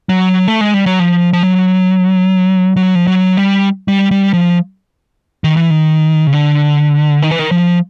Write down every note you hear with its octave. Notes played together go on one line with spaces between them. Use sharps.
F#3
A3
G#3
G3
F#3
F3
F3
F#3
F#3
F3
F#3
G3
G3
G3
F3
D#3
E3
D#3
C#3
D3
D#3
E3
D#3
F3